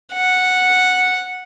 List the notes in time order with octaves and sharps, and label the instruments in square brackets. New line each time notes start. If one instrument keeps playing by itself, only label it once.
[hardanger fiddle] F#5